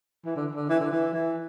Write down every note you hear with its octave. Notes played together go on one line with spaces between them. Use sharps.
E3
D3
D3
E3
D3
E3
E3